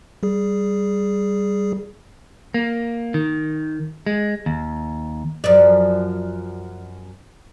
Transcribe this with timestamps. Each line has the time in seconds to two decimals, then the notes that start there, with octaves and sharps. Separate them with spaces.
0.23 G3 G#4
2.54 A#3
3.14 D#3
4.06 G#3
4.46 D#2
5.44 F#2 F3 D5